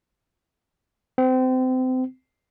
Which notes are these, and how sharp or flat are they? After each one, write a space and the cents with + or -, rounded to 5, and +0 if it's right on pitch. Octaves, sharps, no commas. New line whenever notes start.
C4 -30